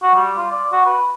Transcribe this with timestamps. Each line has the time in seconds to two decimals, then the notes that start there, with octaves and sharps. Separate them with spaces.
0.03 F#4
0.15 G3
0.37 F4
0.52 D5
0.72 F#4
0.86 B4